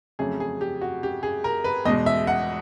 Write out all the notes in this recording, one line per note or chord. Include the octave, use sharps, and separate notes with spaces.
F2 C#3 F#3 A3 G#4
G#4
G4
F#4
G4
G#4
A#4
B4
E2 B2 G#3 D#5
E5
F#5